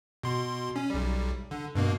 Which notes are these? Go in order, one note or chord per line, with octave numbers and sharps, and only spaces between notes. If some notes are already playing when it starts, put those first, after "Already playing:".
B2 C6
C#4
B1 G3
D3
G2 B2 A#3